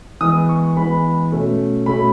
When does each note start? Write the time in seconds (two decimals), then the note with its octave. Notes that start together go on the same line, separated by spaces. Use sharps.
0.21 E3 G#3 B3 D#6
0.49 C#6
0.76 E3 G#3 B3 B5
1.32 B2 A3 C#4
1.86 B2 A3 C#4 B5